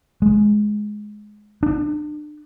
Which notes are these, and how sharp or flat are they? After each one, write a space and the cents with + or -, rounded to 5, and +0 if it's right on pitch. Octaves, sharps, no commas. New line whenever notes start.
G#3 +10
D4 +35